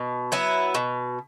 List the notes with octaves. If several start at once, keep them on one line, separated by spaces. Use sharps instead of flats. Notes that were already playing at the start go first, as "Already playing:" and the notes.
Already playing: B2
F#3 B3 E4
B2